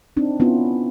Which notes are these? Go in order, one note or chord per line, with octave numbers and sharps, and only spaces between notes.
C4 D4 D#4
B3 C#4 E4 F4